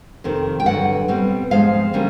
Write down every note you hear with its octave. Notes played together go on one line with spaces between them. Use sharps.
F2 C3 D#3
G5
G2 D3 F#3 F#5
B2 G3 C4
G#2 F3 G#3 C4 F5
D3 G3 A#3 C#4